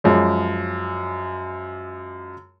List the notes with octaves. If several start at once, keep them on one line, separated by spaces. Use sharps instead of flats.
F#2 F3 G#3